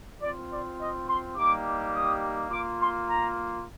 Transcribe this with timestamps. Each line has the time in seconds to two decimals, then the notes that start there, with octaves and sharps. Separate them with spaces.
0.21 C4 F4 D5
0.50 D5
0.79 D#5
1.07 C6
1.36 G3 A#3 D#4 G4 D6
1.94 D#6
2.50 A#3 F4 D6
2.80 C6
3.08 A#5